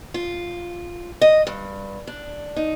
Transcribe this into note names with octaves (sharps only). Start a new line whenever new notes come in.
F4
D#5
G2
D4
D#4